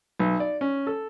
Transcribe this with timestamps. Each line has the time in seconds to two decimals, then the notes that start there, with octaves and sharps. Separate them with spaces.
0.20 B1
0.40 D5
0.61 C#4
0.87 A4